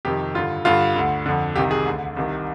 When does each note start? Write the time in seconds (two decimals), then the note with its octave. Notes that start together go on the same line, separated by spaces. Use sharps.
0.05 F2 C3 D#3 G4
0.34 G2 D3 F4
0.65 G2 D3 F4
0.96 D2 D3
1.26 F2 D3
1.56 C2 C3 D#3 G4
1.71 G#4
1.86 D2 D3
2.17 C2 C3 D#3